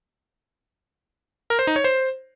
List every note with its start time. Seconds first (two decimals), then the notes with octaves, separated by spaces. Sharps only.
1.50 A#4
1.59 C5
1.67 D#4
1.76 C#5
1.84 C5